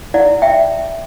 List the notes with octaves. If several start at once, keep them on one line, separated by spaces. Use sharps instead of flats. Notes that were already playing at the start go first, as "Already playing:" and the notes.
E4 D5 F#5
E5 G5